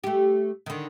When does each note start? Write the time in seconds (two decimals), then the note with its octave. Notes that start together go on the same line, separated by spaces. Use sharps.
0.04 A3 G4
0.66 D3 D#3